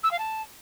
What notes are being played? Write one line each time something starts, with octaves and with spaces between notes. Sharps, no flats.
E6
F5
A5